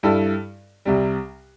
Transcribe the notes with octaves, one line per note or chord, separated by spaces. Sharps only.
G2 G3 E4 A4
C2 C3 G3